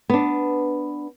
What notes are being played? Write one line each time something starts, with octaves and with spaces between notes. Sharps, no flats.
B3 D4